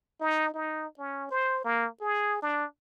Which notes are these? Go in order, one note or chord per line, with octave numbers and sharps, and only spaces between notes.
D#4
D#4
C#4
C5
A#3
G#4
D4